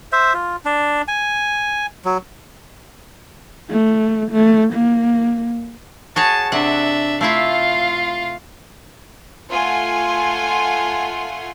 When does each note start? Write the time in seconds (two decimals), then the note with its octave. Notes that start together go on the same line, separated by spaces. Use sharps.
0.12 C5 E5
0.34 F4
0.65 D4
1.08 G#5
2.05 F#3
3.70 A3
4.32 A3
4.74 A#3
6.16 F#4 G#4 C#5 A5
6.52 C3 D4 E5 F#5
7.21 A3 E4 F4 E5 F5
9.51 A3 F4 F#5 G#5 C6